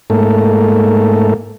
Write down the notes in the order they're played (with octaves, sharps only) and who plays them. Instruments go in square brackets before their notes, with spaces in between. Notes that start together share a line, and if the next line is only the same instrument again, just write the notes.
[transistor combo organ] G#2 A3 A#3